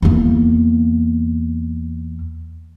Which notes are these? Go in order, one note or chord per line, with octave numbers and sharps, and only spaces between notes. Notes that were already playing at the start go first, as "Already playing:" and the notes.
E2 A#3